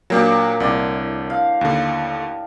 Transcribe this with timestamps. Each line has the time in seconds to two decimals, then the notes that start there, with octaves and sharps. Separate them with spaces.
0.10 A#2 F#3 A#3 D4 G4
0.60 C2 A2 D3 D5
1.30 F5
1.61 D#2 D3